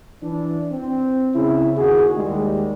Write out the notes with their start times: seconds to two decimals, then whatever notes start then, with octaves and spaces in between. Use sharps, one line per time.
0.23 E3 D4
0.72 C4
1.34 C#3 E4
1.77 D#2 F#4 G#4
2.16 D#2 G3 G#3